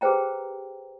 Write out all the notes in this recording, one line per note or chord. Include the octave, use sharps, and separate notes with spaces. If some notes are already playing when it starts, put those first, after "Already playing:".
G4 G#4 B4 C5 G5 A#5